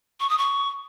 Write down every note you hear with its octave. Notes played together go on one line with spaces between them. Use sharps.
C#6
D#6
C#6